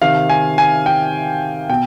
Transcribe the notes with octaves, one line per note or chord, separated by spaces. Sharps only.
C3 D#3 F5
G#5
G#5
G5
B2 G5